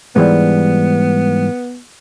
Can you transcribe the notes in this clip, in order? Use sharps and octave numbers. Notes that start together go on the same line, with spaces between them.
G#2 E3 G3 B3